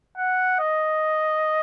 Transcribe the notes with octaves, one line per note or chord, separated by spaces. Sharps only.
F#5
D#5